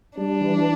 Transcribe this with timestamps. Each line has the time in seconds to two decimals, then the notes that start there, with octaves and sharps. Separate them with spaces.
0.17 G3 D4
0.41 E3